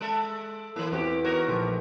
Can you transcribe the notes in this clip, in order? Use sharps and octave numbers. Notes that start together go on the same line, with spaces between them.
G#3 A4 E5
E3 A#3 E4
E2 C4 F#4 G4
B3 D#4 F#4 A#4 C#5
A#1 A3 G4